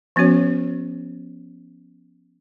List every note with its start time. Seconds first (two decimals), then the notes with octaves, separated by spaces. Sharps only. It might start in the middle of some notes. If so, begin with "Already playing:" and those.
0.16 F3 B3 C#4 F#4 C#5